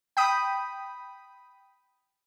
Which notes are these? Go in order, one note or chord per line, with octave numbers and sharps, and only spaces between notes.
G5 B5 D#6